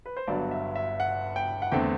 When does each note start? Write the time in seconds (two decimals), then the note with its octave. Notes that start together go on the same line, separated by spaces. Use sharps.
0.06 B4
0.17 C5
0.27 G1 G2 F#3 B3 D5
0.51 E5
0.76 E5
1.00 F#5
1.36 G5
1.62 F#5
1.72 E2 D3 A3 C4 G5